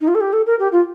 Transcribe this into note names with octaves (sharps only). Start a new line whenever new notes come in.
D#4
F4
A4
G4
A4
A#4
G4
F4